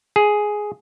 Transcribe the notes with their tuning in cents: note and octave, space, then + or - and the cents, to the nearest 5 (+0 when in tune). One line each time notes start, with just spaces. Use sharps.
G#4 +5